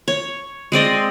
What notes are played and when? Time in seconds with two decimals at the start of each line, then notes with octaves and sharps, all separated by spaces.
0.08 C#5
0.72 G#3 C4 D5 D#5